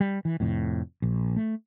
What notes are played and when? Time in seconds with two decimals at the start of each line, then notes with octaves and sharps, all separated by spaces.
0.01 G3
0.25 E3
0.40 F1 F2 A2
1.02 A#1
1.36 A3